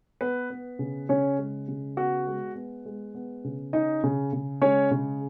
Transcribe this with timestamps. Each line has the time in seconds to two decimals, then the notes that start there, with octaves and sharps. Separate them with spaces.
0.21 B3 B4
0.50 B3
0.79 C#3
1.09 C#3 C#4 C#5
1.39 G#3
1.68 C#3
1.97 B3 F#4 F#5
2.27 G#3
2.55 B3
2.85 G#3
3.15 B3
3.44 C#3
3.73 C#4 D#4 D#5
4.04 C#3
4.33 C#3
4.62 G#3 C#4 C#5
4.91 C#3